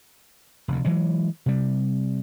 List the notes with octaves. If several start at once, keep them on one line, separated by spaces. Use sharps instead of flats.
F1 D2
E3 F#3 G#3
C3 G3